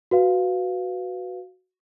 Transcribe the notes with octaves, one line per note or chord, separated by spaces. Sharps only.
F#4 B4 F5